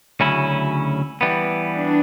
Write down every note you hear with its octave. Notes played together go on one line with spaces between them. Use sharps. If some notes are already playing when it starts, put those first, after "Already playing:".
D2 C#3 F#3 C#4 E4
E3 G3 B3
D4